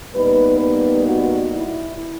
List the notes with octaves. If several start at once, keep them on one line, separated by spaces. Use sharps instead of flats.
A#2 G3 B3 D#4 B4
B4
F#4
E4